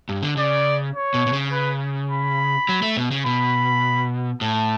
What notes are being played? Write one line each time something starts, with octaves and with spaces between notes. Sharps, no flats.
G2
D3
C#3 D5
C#5
B2
B2
C#3
B4
B5
F#3
A3
B2
C#3
B2 B5
A2 A5